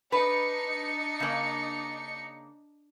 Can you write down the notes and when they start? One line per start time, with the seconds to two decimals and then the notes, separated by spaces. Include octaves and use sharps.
0.12 D4 D#4 B4 C#7
1.20 C#3 A#3